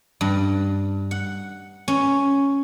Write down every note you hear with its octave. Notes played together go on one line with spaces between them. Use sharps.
G2
F#5
C#4